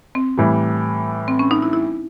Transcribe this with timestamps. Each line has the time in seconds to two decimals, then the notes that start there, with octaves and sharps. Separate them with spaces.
0.15 C4
0.37 A2 E3 G3
1.28 C4
1.39 C#4
1.51 D#4
1.62 E4
1.73 E4